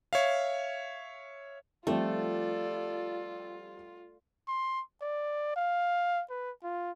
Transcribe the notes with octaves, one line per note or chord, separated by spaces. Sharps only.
C#5 E5 F5
F3 G3 A3 C4 F4 A4 D5
C6
D5
F5
B4
F4